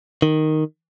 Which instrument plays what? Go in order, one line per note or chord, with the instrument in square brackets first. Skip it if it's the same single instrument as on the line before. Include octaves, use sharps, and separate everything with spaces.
[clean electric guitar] D#3